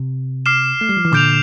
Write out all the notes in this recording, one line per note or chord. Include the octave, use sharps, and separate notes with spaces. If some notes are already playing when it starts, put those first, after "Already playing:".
Already playing: C3
D6 F6 C7 E7
A3
G3
F3
E3
A#2 D3 D6 G6 D7 F7